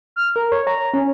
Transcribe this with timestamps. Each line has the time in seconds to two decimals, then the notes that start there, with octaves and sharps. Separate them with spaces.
0.16 F6
0.36 A#4
0.52 C#5
0.67 A#5
0.94 C#4